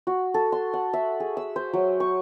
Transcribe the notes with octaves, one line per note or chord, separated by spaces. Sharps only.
F#4
A4
C6
F#5
E5
G#4
E6
C5
F#3
C#6